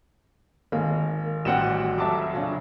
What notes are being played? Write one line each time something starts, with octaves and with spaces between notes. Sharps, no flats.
G#1 A#3
A1 G3 C4 F#4 G4 F#5 G5 E7
F2 F#3 E5 A5 D6
A#2 C#3 D4